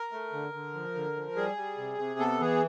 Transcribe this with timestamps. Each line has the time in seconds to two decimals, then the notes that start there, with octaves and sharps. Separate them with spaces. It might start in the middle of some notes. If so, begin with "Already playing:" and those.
Already playing: A#4
0.12 A3
0.33 D3
0.53 D3
0.74 F3
0.95 D3
1.16 F3
1.36 G3 G#4
1.57 G3
1.77 C3
1.98 C3
2.19 B3 A4
2.40 E3 G#4